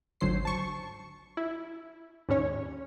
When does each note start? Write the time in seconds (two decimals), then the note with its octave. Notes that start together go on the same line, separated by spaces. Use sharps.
0.21 G#1 D2 F#3 C5 C7
0.45 A5 C#6
1.37 E4
2.29 D#2 G#2 C#4 C#5